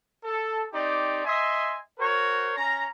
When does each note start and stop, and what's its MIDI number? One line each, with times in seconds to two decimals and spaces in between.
0.23 0.63 69
0.72 1.21 60
0.72 1.21 63
0.72 1.21 67
0.72 1.21 74
1.25 1.76 75
1.25 1.76 76
1.25 1.76 80
1.25 1.76 84
1.99 2.52 66
1.99 2.52 70
1.99 2.52 72
1.99 2.52 73
2.56 2.87 61
2.56 2.87 82